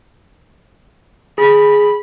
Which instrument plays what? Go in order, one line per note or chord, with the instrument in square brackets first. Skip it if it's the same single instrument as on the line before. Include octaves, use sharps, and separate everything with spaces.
[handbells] G#4 [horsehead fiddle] B5